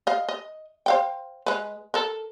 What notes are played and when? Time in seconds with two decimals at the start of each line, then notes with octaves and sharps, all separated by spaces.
0.07 D#5 F5
0.29 D#5
0.86 C5 F5 G5
1.46 G#3 B4
1.94 A4 A#4